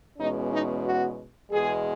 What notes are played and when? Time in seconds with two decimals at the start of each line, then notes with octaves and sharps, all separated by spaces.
0.17 E2 B2 G#3 C#4 D#4
0.51 D#4
0.84 F#4
1.51 E2 B2 G#3 G#4